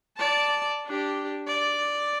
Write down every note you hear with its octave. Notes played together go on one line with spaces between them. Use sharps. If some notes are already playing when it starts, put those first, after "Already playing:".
D5 A5
D4 G4
D5